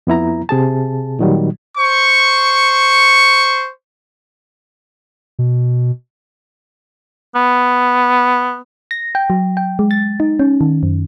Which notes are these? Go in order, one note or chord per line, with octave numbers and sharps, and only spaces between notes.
F2 B3 E4 A#5
C3 G#4 A5
A#2 D#3 F#3 G3
C5 C#6
B2
B3
A#6
G5
F#3
G5
G#3
A6
D#4
C#4
D#3
F#2